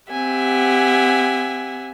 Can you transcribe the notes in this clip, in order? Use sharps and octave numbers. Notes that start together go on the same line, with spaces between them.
C4 G4 E5 F#5 G#5